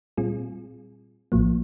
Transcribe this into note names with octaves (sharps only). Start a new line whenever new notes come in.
A#2 G3 C4 F4 G#4
A#1 A2 F3 A#3